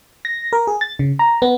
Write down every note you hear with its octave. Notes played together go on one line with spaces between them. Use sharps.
A#6
A#4
G#4
A6
C#3
A#5
B3